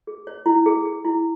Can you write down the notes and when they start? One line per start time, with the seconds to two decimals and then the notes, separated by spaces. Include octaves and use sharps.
0.07 G#4
0.27 C#5
0.46 E4
0.66 G#4
0.85 G#4
1.05 E4